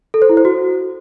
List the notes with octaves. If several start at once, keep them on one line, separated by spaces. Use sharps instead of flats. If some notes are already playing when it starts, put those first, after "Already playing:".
A4
C5
E4
C5
F#4